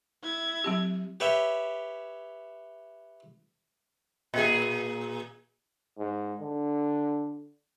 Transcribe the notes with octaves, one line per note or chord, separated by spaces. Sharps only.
E4 G#6
F#3 C4 G4
G4 B4 C#5 E5 G5
A#2 G#4
G#2
D3